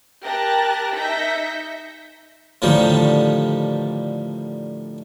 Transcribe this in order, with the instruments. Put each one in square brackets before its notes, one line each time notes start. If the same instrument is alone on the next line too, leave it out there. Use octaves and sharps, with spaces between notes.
[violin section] G4 A#4 A5 F#6 A#6
D#4 E5 G6 A#6 B6 C#7
[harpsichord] A2 D3 D#3 F3 G3 G4